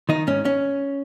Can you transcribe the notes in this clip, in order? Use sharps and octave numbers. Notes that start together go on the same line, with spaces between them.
D#3 D#4
G#2 C#4
C#4